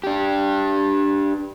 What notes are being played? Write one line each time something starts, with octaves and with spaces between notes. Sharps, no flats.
D4 G4